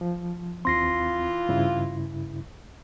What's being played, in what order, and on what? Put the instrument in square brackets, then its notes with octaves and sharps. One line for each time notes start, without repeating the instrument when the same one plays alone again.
[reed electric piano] F3
[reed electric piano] D#2 C4 [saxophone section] E3 F4 [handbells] C6 A#6 C7
[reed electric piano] G2 C#3 E4